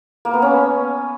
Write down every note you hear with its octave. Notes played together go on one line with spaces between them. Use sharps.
A#3
B3
C#4